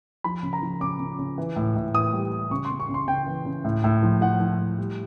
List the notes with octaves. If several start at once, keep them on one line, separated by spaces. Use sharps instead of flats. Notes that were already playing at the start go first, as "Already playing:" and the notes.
F3 B5
C#3
A#5
F3
C#3 D6
C#3
C#3
E3
A2
A2
E3 D#6
G3
G3
C#3 C#6
C6
C#3
C#6
C#3
C6
C#3 G5
E3
C#3
A2
A2
F3
F3 F#5
F3
A2
G3